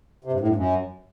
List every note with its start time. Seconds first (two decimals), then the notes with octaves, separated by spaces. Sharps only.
0.24 C3
0.32 G2
0.40 A2
0.48 G2
0.56 F#2